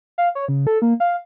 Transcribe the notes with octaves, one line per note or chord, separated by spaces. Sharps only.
F5
C#5
C#3
A4
A#3
F5